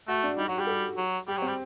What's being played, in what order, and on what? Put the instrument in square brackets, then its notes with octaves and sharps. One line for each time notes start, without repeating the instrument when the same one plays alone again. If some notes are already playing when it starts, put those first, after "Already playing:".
[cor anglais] A3 [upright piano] F#4
[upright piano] D4
[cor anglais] G3 [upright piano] D#4
[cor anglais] F#3 [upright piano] F#4
[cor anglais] G3 [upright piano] G4
[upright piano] A4
[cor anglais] F#3
[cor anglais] G3 [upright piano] G4
[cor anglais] F#3
[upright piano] C4
[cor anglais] G3